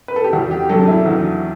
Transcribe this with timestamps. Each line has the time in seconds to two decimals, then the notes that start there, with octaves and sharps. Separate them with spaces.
0.08 B4
0.16 A4
0.24 G4
0.33 E2 F#4
0.51 G4
0.69 D3 F#3 A4
0.81 D4
0.87 E4
1.06 E2 F#4